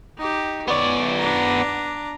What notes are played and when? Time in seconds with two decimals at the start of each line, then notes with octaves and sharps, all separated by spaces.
0.18 D#4 G4
0.68 B3 C#5 D5
1.17 D4 A#5